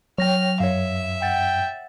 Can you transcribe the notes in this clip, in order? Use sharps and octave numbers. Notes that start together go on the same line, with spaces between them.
F#3 C#5 G5 F6 A#6
F#2 C#5 E5 F5
F#5 G5 A6